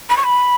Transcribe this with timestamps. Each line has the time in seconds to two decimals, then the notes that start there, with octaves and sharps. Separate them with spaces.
0.09 B5
0.17 C#6
0.24 B5